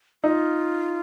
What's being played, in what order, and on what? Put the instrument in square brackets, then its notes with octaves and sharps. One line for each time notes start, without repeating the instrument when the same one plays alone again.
[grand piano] D#4 [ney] F4